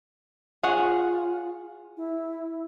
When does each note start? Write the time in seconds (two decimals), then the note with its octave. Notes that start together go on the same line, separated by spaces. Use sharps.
0.63 F4 G#4 C#5 F#5
1.97 E4